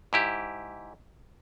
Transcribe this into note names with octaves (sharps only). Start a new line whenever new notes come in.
G#2 E4 G4